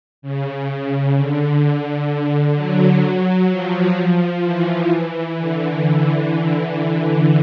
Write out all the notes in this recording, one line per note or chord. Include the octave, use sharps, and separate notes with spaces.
C#3
D3
F#3
F3
E3
D3